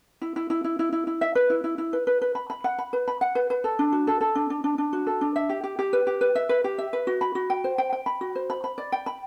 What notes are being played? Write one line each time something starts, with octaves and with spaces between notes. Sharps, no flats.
E4
E4
E4
E4
E4
E4
E4
E5
B4
E4
E4
E4
B4
B4
B4
B5
B5
F#5
B5
B4
B5
F#5
B4
B4
A4
D4
F#4
A4
A4
D4
D4
D4
D4
F#4
A4
D4
E5
G4
G4
G4
B4
G4
B4
E5
B4
G4
E5
B4
F#4
B5
F#4
G5
C5
G5
G5
B5
F#4
C5
B5
B5
D5
G5
B5